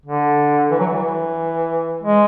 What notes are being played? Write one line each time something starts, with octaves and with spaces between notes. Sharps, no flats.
D3
E3
F#3
E3
G#3